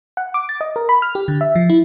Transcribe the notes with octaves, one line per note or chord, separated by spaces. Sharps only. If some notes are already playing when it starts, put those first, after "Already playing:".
F#5
D6
A6
D#5
A#4
B5
F6
G4
D3
E5
F3
E4